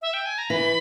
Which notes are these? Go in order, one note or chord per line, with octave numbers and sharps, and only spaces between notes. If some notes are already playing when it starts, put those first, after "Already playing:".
E5
G5
G#5
A#5
E3 B5